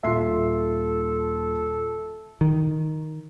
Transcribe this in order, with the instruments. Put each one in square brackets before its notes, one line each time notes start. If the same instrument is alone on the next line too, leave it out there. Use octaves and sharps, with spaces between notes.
[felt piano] D#1 C6 C7 [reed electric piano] F4 E5 [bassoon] A4
[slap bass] D#3